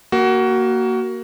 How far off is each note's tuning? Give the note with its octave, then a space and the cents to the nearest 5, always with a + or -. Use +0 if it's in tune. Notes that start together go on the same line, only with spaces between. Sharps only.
A#3 +0 F#4 +20